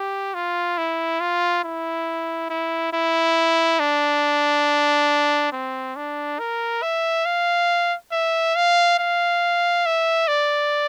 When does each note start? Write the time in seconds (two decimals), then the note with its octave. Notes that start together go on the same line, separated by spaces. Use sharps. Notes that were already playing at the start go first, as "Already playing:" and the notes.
Already playing: G4
0.34 F4
0.78 E4
1.20 F4
1.64 E4
2.50 E4
2.93 E4
3.80 D4
5.52 C4
5.96 D4
6.39 A#4
6.82 E5
7.26 F5
8.12 E5
8.56 F5
8.99 F5
9.86 E5
10.28 D5